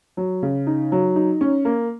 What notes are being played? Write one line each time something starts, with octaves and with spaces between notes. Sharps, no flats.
F#3
C#3
D#4
F#3
D#4
C#4
A#3